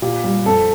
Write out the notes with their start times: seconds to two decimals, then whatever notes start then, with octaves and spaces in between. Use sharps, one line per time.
0.02 A#2 G4
0.24 G3
0.46 F2 A4